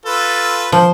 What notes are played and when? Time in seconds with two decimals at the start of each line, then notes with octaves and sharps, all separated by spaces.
0.06 F4 A4 B4
0.72 F3 C5